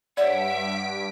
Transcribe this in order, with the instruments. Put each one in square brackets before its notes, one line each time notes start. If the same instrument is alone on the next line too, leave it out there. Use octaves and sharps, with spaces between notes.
[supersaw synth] G2 B6 D7 [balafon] C#5 D5 [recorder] E5 [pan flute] F#5